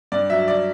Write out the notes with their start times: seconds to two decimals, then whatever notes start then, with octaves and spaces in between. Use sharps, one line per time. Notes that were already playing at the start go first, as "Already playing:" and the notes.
0.12 G2 D5
0.30 F#3 E5
0.48 D5